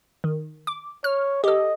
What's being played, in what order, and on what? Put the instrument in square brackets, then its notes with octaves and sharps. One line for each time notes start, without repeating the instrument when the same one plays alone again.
[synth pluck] D#3
D6
[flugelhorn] C#5 [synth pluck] F6
[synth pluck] G4 A4 [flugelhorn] D#5